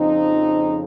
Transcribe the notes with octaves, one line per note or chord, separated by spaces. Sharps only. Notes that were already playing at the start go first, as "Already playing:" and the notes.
Already playing: F2 C#3 F3 C4 D#4